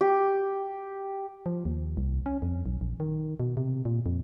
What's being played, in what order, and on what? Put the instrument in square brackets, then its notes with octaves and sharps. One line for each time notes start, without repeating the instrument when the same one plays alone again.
[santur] G4
[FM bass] F3
D#2
C2
C#4
F2
B1
A#1
D#3
B2
C3
A#2
F2